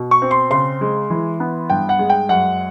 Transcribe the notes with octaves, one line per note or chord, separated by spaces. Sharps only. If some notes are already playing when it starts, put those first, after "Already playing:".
Already playing: B2
C#6
C4
C6
C#3 C6
G#3
E3
B3
G2 G5
F#5
G#3
G5
F#2 F#5